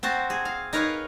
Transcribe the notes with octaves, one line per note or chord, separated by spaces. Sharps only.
C4 F#4 C5 A5
G#4
F5
D#4 A#4 B4 C#5 F5